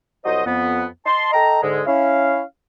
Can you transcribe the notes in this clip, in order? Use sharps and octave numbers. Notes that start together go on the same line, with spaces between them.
C2 F#3 F#4 C5 D#5
F2 B3
D#5 A5 C6
A4 D#5 G5 A#5
G#2 D3 G#3
C#4 E4 F5